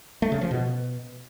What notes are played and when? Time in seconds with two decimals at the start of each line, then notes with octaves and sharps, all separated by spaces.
0.22 A3
0.32 C#3
0.41 F3
0.51 B2